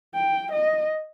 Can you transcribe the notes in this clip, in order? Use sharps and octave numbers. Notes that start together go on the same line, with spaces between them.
G5
D#5